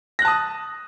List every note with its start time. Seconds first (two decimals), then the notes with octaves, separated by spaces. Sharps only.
0.19 A#6
0.22 F#6
0.25 A5
0.28 D#6